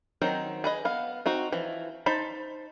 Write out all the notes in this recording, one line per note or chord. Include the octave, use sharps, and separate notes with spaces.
D#3 F#3 C4 D#4
G#4 B4 D#5
B3 F5
C4 D#4 F#4
E3 F3
D#4 C5 A5 B5